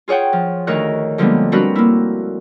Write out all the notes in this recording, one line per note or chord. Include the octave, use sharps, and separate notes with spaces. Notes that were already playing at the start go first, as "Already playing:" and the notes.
F4 G#4 C#5 F#5 G5
F3
D2 D#3 A#4 C#5 F#6
D3 F3 G3 G#3 A#3 B3
G3 C4 D4 F#4 A#4 B4
A#3 E4